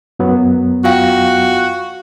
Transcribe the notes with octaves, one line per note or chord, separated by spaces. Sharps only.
F#2 F#3 B3
F4 F#4 F5 G5